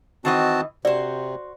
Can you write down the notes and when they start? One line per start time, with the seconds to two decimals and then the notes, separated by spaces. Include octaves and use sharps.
0.25 D#3 E3 C4 F#4 D#5 A5
0.85 C3 F#4 C5 D5